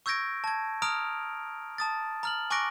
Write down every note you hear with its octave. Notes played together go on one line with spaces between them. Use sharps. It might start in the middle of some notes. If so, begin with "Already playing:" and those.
C#6 E6 G6 G#6 A#6 D7
A5 G#6
A#5 D#6 F6 D7 F7
A5 D#6 A6
A#5 F6 F#7
G#5 C#6 D6 F#6 A#6 D7